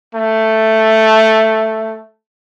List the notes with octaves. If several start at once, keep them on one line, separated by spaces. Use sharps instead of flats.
A3